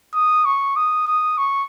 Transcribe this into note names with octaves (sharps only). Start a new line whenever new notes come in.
D#6
C#6
D#6
D#6
C#6